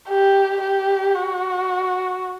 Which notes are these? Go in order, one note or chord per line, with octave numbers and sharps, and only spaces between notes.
G4
G4
F#4